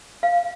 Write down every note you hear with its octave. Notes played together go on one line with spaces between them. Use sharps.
F5